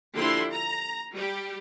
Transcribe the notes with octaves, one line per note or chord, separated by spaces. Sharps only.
D3 F3 A#3 E4 G4 C6
A#5
G3 G4